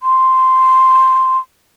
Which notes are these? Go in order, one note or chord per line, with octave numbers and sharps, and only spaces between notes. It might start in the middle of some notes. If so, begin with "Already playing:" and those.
C6